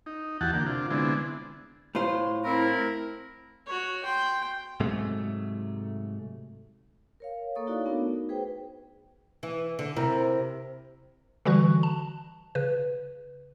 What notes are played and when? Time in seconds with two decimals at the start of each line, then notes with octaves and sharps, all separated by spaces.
0.06 D#4
0.41 E2 E3 F#4 G4 F#5 A5
0.53 D3 A#3 G4
0.66 C3 D4 F4
0.91 D3 G#3 B3 C4 D4 E4
1.95 A2 F4 C5
2.45 C4 E4 A#4
3.66 F#4 C#5
4.04 G5 C6
4.80 G#2 C3 F#3 A3
7.20 A#4 C#5 F5
7.55 A#3 A4 C#5 C#6 D#6
7.67 D#4 E4 F#4 A4 D5 F5
7.85 A3 B3 D4 D#4 F#4 A#4
8.10 D#4
8.29 G#4 B4 C5 G5
9.43 E3
9.79 D3
9.96 C3 E4 A#4 A#5
11.45 D3 E3 G3 F#4 C#6 F#6
11.83 A5
12.55 C#3 B4